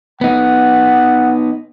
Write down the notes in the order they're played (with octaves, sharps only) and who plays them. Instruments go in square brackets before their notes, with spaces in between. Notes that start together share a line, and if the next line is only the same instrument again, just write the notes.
[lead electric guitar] B3 D#4 [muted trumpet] F#5